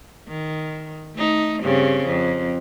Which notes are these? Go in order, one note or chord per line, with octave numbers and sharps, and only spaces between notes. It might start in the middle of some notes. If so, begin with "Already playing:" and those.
D#3
A3 D#4
G2 C#3 C4
F2